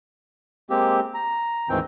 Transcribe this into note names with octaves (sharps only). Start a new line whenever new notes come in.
G#3 A#3 C4 G4
A#5
D2 G#2 D#3 E3 C4 G5